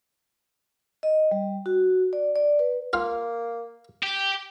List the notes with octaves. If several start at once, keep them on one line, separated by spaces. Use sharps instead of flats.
D#5
G3
F#4
D5
D5
B4
A#3 F4 F5
G4